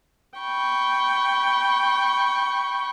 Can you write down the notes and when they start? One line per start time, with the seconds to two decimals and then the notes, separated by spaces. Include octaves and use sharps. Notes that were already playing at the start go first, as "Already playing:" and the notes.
0.38 G5 B5 C#6